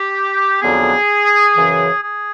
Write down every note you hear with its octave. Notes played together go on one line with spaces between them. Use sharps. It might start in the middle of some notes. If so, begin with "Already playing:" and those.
Already playing: G4
F2 D3 F#3 B3 G#4
F#2 C#3 E3
G#4